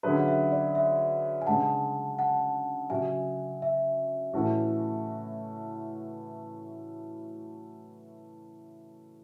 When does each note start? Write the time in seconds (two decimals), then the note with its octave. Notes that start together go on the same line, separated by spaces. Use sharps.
0.03 D3 F#3 C#4 G#4 B4 E5
0.19 F#5
0.28 E5
0.52 D5
0.75 E5
1.42 G#5
1.46 C#3 G#3 D4 F#5 A5
2.19 F#5 A5
2.90 C#3 F#3 C#4 F#4 E5 G#5
3.62 E5
4.33 A2 E3 A3 C#4 F#4